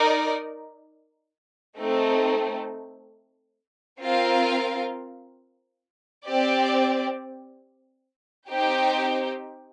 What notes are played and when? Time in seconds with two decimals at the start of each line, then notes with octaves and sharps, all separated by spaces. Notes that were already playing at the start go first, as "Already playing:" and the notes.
Already playing: D#4 A#4 D5
1.77 A3 C4 D#4
4.01 C4 F4 A#4 F5
6.26 C4 G4 D5
8.49 C4 D#4 G4 C5 G5